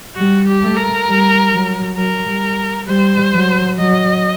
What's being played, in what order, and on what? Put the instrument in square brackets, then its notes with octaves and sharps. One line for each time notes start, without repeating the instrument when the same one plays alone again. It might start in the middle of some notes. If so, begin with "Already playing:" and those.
[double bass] G3 [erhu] F#4
[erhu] G4
[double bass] A3
[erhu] A#4
[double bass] G3
F#3
[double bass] F#3 [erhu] A#4
[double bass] G3
[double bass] G3 [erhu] C5
[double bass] F#3
[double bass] F#3 [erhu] D#5